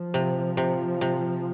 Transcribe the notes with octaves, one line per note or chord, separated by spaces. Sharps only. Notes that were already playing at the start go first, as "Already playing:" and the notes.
Already playing: F3
C3
C3
C3